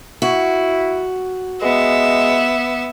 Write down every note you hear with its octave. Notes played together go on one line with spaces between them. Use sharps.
E4 F#4
G#3 B3 E5